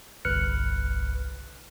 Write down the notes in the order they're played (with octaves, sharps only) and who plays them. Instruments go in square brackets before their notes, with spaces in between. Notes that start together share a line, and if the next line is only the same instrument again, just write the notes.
[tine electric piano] G1 C2 B4 F6 F#6 C#7